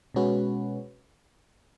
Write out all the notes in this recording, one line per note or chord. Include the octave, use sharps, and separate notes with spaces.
B2 G#3 C#4 F#4 B4